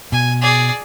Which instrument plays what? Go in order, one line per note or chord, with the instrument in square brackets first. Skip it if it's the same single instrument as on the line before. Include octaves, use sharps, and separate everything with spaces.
[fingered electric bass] B2 [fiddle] G#5
[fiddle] G#4 D5